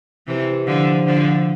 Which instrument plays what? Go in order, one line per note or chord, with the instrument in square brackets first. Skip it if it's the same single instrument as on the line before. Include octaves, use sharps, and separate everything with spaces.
[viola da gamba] C3 E3
D3 F3
D3 F3